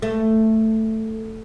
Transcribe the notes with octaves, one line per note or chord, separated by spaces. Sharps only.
A3